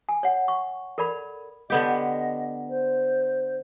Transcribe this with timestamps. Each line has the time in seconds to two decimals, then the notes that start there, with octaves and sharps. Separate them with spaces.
0.09 G#5
0.23 C#5 F#5
0.48 C#6
0.98 A4 A#4 D5 B5
1.70 D3 B3 G4 D#5
2.70 C5